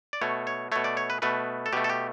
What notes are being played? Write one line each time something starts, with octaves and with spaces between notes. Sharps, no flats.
D5
B2 A3 C#5
C#5
B2 A3 C#5
D5
C#5
B4
B2 A3 B4
A4
B2 A3 G4
A4
G4